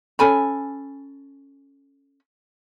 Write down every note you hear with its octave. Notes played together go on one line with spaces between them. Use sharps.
C#4 A4 G#5 B5